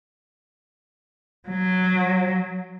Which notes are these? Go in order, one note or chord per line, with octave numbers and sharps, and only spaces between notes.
F#3